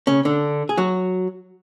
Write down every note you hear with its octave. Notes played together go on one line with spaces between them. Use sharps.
C#3 C#4
D3 D4
G#4
F#3 F#4